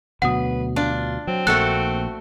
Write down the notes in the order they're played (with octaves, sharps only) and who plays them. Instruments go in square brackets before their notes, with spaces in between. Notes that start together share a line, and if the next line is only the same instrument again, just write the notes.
[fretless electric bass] D2 B2 F#3 [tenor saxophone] B4 [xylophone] F#5 D#6
[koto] D4 [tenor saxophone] F4
[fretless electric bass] F#3 [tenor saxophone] C4
[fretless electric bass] A#1 A#3 [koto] A3 F#4 A4 [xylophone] F#6